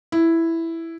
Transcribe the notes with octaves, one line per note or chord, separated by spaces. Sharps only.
E4